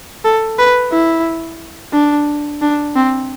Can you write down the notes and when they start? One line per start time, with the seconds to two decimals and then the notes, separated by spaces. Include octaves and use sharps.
0.25 A4
0.59 B4
0.92 E4
1.93 D4
2.62 D4
2.96 C4